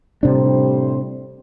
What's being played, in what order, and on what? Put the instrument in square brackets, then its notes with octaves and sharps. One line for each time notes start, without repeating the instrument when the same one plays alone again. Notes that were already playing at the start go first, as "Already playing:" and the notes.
[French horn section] A2 G3 C5 [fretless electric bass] C3 D4